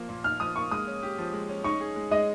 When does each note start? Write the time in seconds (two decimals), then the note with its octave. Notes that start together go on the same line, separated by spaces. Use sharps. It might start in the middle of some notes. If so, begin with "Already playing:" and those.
Already playing: F3 A#3
0.09 A#2
0.24 A#2 F6
0.40 F3 D#6
0.56 A#3 C#6
0.71 G#3 D#6
0.87 C#4
1.03 G4
1.18 F3
1.33 G#3
1.49 C#4
1.64 D#4 C#6
1.81 G#4
1.96 G#3
2.11 G#3 D#5